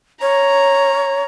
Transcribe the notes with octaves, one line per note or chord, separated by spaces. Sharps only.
C#5 A#5